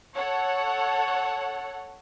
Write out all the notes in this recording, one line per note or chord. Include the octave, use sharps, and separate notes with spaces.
A4 C#5 F#5